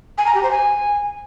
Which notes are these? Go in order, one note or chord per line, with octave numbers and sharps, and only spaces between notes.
G#5
A#5
G4
C5
G#5